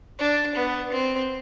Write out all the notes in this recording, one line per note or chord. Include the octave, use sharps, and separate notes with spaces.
D4
B3
C4